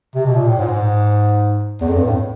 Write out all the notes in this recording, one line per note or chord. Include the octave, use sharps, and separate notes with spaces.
C3
B2
A#2
A2
G#2
G#2
E2
F2
G2
A2